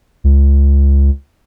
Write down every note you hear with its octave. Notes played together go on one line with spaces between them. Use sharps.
C#2